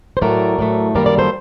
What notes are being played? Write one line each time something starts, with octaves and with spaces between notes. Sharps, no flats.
C5
A2 F#3 A3 A#4 D5
A2 F#3 A3
F#2 D#3 G3 A#3 A#4 D5
A#4 D5
A4 C5